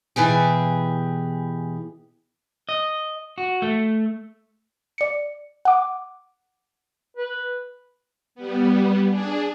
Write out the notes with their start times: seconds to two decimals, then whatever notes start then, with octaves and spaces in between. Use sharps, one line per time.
0.16 B2 E3 G4 G#4
2.69 D#5
3.38 F#4
3.62 A3
4.98 D5 C#7
5.65 F#5 D6
7.17 B4
8.35 G3 B3
9.09 D4 G#4